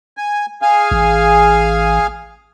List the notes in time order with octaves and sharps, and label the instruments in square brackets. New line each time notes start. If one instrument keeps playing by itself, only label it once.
[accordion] G#5
G#4 F5 G#5
[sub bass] A1